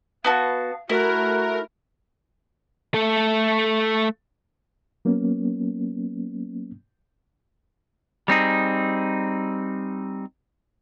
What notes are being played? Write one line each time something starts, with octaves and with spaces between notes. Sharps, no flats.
B3 F#4 F5 A5
A3 E4 F#4 A#4
A3 A4
F#3 A#3 B3 C#4
G3 C4 D#4 G#4